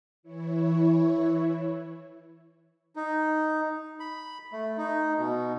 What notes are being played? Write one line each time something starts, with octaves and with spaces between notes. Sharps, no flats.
E3 E4 C#5
D#4
B5
A3
D#4
B2